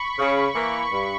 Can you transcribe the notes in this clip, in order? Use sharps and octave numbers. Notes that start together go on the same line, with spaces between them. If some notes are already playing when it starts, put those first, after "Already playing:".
Already playing: B5 C#6
C#3
E3 A#3
G2